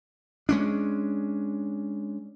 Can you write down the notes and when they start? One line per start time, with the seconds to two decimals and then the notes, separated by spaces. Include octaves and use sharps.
0.49 G#3 C#4 D4